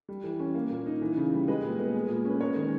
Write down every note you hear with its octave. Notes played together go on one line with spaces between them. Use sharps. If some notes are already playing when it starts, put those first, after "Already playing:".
G3
E3
C#4
A#3
A#2
D#4
E3
C#3
G3
G#3 B4 D#5
A#2
B3
G#3
A#2
C#4 B4
G#3 A#4 C#5
D#3